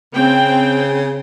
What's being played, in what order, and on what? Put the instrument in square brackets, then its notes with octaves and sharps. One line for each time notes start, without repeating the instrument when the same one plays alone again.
[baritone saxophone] C#3 [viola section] C4 G5